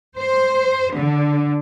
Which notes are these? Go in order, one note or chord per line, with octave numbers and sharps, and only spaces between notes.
C5
D3